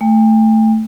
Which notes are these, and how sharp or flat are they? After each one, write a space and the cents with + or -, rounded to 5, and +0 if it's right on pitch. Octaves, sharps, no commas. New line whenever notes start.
A3 +0 G5 +35